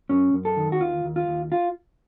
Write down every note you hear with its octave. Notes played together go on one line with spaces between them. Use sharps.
F#2 C#4
F#2
A4
D#3
F#4
D#2 F4
D#2
F4
D#2
F4